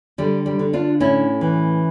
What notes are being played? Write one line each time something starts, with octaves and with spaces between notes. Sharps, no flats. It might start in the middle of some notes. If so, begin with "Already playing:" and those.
D3 G3
G3
D3
D4 F4
A2 C#4 E4
E3